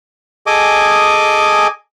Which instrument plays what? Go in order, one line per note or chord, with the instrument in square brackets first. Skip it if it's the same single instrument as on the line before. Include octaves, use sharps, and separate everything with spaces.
[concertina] G#4 A4 D#5 G#5 D6